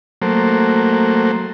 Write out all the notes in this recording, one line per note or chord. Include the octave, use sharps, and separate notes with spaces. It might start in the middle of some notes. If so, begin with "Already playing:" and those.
F#3 A3 A#3 C5